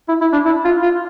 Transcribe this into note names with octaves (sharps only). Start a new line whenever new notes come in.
E4
E4
D4
E4
F4
F4